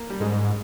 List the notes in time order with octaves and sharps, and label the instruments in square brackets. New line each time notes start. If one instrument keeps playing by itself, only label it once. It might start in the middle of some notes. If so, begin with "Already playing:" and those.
Already playing: [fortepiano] A#3
G3
[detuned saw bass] G#2 [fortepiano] G#3